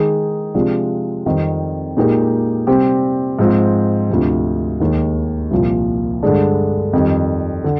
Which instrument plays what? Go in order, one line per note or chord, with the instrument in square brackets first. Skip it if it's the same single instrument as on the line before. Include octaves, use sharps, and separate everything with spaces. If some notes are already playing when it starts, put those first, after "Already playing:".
Already playing: [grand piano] D#3 G#3 D#4 G#4
C3 F3 G#3 D4 F4
F2 D#3 G3 C4
A#2 G#3 D#4 G4 A#4
C3 G3 C4 G4
G#2 F3 C4
D2 C3 F3
D#2 D#3 G#3 D#4
C2 A#2 F3
G2 D3 G#3 D4
F2 D#3 G3
D3